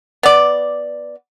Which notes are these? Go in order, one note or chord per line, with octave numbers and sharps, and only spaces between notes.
B3 D5